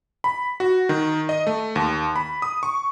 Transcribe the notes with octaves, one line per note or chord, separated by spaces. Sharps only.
B5
F#4
D#3
D#5
A3
D#2
B5
D#6
C#6